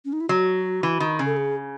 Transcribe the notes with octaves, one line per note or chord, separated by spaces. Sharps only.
C#4
D#4
E4
F#3 F#4
E3
D#3
C#3
A4
G#4